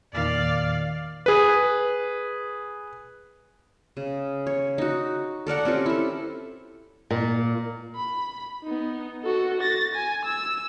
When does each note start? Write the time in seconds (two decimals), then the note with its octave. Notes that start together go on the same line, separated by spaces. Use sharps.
0.13 E2 A#2 D#3 D5 F5
1.26 G#4 B4
3.97 C#3
4.47 C#5
4.78 D#4 F#4
5.47 A4 A#4 D5 F#5
5.65 C4 C#4 F4 G4
5.86 E4 A4
7.11 A#2
7.96 B5
8.64 B3 D#4
9.23 F#4 A4
9.61 A6 A#6
9.95 G#5
10.25 E6